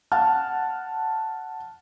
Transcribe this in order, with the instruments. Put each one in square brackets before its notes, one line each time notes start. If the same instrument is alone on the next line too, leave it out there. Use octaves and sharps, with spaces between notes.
[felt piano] F#5 A5 F6